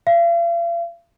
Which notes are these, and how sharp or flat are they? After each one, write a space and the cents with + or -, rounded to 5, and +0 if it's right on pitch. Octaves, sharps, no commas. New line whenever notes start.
F5 -40